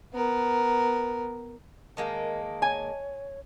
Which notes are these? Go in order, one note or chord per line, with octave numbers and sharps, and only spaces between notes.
B3 A#4
D#3 G#3 A#3 A#4 D#5 A5
C#5 G#5